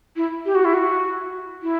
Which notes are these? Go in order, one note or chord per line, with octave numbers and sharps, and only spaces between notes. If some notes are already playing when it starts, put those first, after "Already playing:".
E4
G4
F#4
E4
F#4
E4